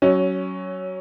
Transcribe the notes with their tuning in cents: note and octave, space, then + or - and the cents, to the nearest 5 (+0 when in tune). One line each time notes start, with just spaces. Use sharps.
F#3 +20 C#4 +0